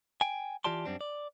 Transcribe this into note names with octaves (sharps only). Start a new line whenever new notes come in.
G5 G#5
E3 F4 G4 D5 A5 C6
F#2 G3 C4 D4
D5